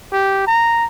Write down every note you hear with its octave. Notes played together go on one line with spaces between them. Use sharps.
G4
A#5